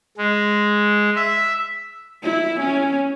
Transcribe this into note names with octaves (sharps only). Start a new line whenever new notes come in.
G#3
E5
E4
C#4